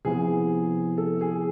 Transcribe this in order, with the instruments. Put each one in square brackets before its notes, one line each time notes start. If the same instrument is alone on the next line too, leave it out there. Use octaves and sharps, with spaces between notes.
[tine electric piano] C3 F3 B3 E4 [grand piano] G#4
[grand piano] A4
G#4